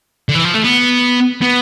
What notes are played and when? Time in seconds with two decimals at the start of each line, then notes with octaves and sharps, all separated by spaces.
0.29 D3
0.34 E3
0.45 F3
0.54 A3
0.64 B3
1.41 B3